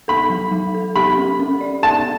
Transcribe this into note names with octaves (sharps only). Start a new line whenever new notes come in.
A4 B5
F#3
F#3
A4
G4 B5
C#4
C#4
D5
A4 A5